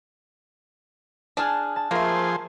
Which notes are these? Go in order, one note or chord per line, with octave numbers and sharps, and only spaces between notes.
D4 G#4 A5 F6 F#6
A5
F3 A3 A#3 G#4 C5